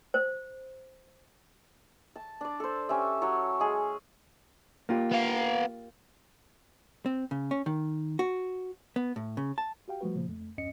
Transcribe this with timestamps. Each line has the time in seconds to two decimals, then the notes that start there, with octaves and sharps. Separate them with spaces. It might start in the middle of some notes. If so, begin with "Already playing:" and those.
0.14 C5
2.16 A5
2.41 D4 D5
2.60 A4 C5
2.89 C#4 G4 E5
3.22 F#3 C#5
3.60 G#3 G#4
4.89 A#3 F4 G4
5.11 B3 F5
7.06 C4
7.31 C#3
7.51 C#4
7.66 D#3
8.19 F#4
8.96 B3
9.16 A2
9.37 C#3
9.58 A5
9.88 F#4 G4 F5 G5
10.01 F3 G3 A3 F#4 B4
10.15 A#2 C#3 F3 A#3
10.28 F2 A3
10.57 A#1 E2 G2 C#4 D#5 C#7